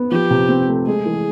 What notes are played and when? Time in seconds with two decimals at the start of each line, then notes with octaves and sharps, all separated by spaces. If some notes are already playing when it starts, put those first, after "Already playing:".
Already playing: B3
0.11 F3 G4
0.31 C3
0.49 C4
0.68 A3
0.86 G#3 G#4
1.06 E3